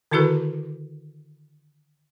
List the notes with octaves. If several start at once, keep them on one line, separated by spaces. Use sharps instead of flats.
D3 D#3 E4 F#4 A4 B4